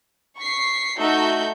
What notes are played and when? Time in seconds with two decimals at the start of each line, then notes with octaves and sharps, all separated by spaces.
0.38 C#6 B6 C7
0.98 A3 D#4 F#4 E5 G6